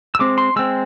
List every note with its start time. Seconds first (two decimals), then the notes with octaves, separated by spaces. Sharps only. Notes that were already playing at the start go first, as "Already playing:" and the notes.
0.15 E6
0.19 G#3 C4 D6
0.38 C6
0.56 G#3 C4 E6